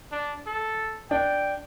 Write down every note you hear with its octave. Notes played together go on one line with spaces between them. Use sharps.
D4
A4
D4 G5